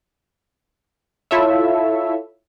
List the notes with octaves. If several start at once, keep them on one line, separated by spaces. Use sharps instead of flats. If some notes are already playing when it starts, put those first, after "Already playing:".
E4 F4 A4 C#5 E5